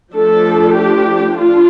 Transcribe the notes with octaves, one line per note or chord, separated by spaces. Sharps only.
F3 A3 D4 A4
G4
D4 F4